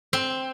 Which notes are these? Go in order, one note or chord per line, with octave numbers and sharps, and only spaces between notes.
C4